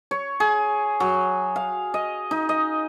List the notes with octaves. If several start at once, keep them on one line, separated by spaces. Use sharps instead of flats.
C#5
G#4
F#3
F5
D#5
D#4
D#5